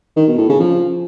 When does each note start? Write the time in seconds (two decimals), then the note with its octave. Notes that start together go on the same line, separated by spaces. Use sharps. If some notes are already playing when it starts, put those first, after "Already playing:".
0.16 D#3
0.27 B2
0.38 A2
0.49 C#3
0.60 F3